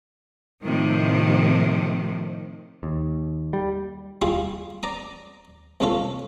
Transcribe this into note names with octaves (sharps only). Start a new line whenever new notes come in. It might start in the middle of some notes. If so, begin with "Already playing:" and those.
A2 C3 D#3 F3
D#2
G3
G3 E4 F4 G#4
D5 A#5 D#6
C2 G#3 C#4 F4 A4